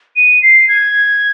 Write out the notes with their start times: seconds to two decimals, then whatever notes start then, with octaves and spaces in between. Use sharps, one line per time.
0.16 D#7
0.42 C7
0.68 G#6